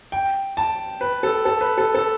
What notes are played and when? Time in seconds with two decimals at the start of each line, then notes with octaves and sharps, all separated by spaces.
0.12 G5
0.57 A5
1.01 B4
1.23 A4
1.45 A4
1.61 B4
1.78 A4
1.95 A4